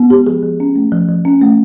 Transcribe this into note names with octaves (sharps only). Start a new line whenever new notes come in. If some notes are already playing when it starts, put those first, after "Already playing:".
Already playing: B3
G#3 G4
F3 G#4
F3
C#4
A3
F3
F3
C#4
A3